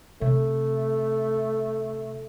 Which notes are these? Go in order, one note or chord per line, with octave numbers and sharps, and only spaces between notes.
C3 A3